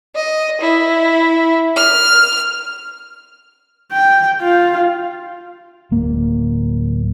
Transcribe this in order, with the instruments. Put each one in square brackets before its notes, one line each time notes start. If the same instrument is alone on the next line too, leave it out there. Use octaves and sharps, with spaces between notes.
[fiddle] D#5
E4
F6
[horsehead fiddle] G5
F4
[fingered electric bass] D1 A#3